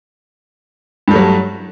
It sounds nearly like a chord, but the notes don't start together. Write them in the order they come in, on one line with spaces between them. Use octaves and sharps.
G2 G3 A3 F#3